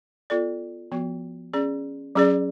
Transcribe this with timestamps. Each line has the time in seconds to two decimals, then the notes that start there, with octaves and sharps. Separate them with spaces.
0.30 B3 F4 A4 D5
0.92 F3 B3 F#4
1.53 C#4 G#4 D5
2.15 F#3 C#4 G#4 D5